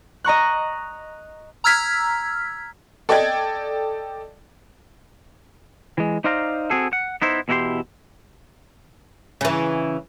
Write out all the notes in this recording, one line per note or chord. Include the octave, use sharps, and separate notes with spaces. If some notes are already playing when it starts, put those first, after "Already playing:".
D#5 A#5 C#6 F#6
A#5 E6 F6 G#6 B6
A4 D5 D#5 G5 G#6
E3 G#3
D#4 C5 D5 F5 A#5
C4 F#4 G#4 A4
F#5
B3 D#4 E4 C5
E2 B2 E4 F#4 G4 C6
C#3 E3